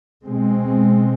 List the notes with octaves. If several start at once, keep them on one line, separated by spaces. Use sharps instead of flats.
B2 G#3 C4